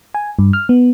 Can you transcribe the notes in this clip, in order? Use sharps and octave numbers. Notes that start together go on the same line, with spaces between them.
G#5
G2
F6
B3